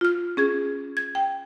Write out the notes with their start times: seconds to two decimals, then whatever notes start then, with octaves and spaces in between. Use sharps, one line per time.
0.01 F4 F6
0.37 C#4 G#4 G#6
0.97 G#6
1.15 G5